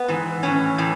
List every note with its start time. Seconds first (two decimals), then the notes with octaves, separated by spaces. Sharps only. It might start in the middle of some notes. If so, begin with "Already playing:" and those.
Already playing: B3
0.08 G#2 E3
0.43 A2 E3 C#4
0.78 A2 E3